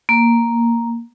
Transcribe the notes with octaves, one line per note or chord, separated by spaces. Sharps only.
A#3